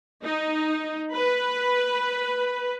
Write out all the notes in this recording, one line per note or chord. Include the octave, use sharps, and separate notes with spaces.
D#4
B4